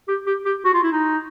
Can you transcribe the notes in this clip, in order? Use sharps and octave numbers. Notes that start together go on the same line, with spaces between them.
G4
G4
G4
F#4
F4
E4
D#4